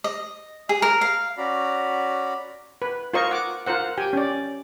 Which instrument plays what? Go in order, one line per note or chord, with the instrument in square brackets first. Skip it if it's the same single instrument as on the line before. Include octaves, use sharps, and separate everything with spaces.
[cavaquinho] D#5
G#4
A#4
F5
[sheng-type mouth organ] C#4 F#4 D5 A#5 B5
[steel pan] B4
F4 A#4 C5 D#5 C#6
F#5 D6
F4 A#4 C5 F#5
G4 G5 G#5
C#4 D5